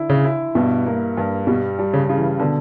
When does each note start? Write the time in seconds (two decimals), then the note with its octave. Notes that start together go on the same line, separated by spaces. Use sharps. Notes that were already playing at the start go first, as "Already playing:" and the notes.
Already playing: D3 E4
0.09 C#3
0.24 E4
0.55 G2 B2
0.86 A#3
1.17 G2
1.47 B2 G3
1.79 G3
1.93 C#3
2.09 C#3
2.17 E3
2.39 B2 D3